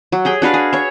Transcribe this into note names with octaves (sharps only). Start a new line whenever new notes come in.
F#3
G4 G#4 G5
D4 F#4 B4 F5
G#4
C#5 E5